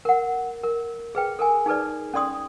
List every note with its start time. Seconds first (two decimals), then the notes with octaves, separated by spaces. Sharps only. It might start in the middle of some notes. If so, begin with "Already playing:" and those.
0.05 A#4 F#5
0.64 A#4
1.15 G#4 B4 G5
1.39 A4 A#4 G#5
1.66 D#4 G#4 A4 B4 D5
2.14 C#4 A4 D5 C6 D#6